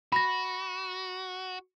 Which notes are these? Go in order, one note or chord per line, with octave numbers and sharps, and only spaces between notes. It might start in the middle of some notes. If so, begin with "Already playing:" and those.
F#4 B5 A#6